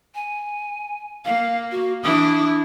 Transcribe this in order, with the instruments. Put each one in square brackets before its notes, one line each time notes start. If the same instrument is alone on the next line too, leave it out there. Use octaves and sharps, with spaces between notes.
[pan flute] G#5
[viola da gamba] A#3 [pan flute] F5
[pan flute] F#4
[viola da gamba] E3 D4 E4 [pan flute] D#6